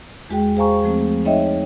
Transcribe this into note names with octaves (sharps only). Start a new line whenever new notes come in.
E2 G#3 F#4 G#4 G5
G#4 C5 F5 G#5 A#5 C#6
F3 A3 C4
D#4 C#5 D#5 E5 G5